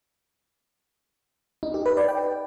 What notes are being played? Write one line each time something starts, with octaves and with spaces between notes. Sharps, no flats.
D#4
G4
B4
D5
G5